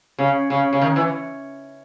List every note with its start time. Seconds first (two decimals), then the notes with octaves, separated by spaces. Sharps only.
0.19 C#3
0.50 C#3
0.73 C#3
0.82 D#3
0.96 E3